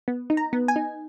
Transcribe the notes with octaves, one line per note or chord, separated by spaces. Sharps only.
B3
D#4
A#5
B3
G#5
D#4